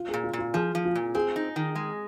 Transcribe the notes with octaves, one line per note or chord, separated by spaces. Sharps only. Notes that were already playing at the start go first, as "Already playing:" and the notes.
Already playing: F4
A#2 G#4
F4
A#2
F4
F3 G#4
F3
F4
A#2
C4 G#4
D#4
D#3
G#3